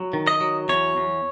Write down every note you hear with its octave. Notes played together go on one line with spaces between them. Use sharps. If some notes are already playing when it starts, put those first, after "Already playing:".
Already playing: F#3
D#3
D#5
F#3
E2 C#5
E2